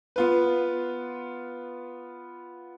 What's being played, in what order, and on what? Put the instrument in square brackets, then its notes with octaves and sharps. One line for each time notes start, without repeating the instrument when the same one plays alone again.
[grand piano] B3 F4 B4